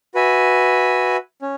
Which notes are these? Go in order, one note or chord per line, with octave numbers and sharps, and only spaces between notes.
F#4 B4 E5 G#5
C#4